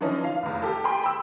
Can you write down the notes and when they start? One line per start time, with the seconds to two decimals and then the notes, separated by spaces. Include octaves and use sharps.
0.01 D3 E3 F3 C#4 D#4
0.24 F5
0.42 F1 E2
0.62 G4 A4
0.84 G5 G#5 B5 C6
1.03 B5 E6